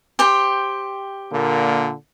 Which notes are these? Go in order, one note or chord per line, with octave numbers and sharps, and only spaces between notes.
G4 C5 G5
A#2 D3 A#3